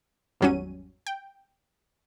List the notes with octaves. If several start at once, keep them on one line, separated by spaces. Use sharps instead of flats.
G#1 E2 F#3 G3 C#4 D#7
G5